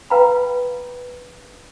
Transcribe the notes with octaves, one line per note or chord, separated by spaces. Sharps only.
B4 F5 G5 A#5 B5